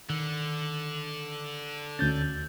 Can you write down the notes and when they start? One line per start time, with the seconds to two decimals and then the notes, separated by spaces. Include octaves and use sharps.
0.10 D3 D#3
1.99 D2 C#4 G6 A6